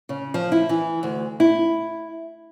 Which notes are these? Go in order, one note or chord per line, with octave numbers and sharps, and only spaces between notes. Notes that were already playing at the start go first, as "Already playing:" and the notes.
C#3
F3
E4
E3
D2
E4